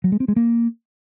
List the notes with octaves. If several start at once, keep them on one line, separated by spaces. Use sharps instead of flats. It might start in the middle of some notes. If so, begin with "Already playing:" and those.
F#3
G#3
C4
G#3
A#3